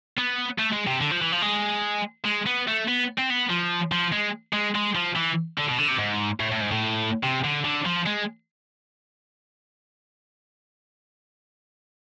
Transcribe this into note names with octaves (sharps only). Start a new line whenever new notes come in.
B3
A3
G#3
C3
D3
F3
E3
F3
G#3
G#3
B3
A3
B3
C4
B3
F3
F3
G#3
G#3
G#3
F3
E3
D3
B2
D3
C3
G#2
A2
A2
G#2
A2
C3
D3
D3
F3
G#3